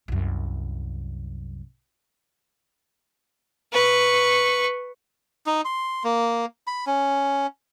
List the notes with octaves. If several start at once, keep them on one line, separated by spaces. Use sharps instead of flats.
C2 F#2
B4 C#6
D#4
C6
A#3
B5
C#4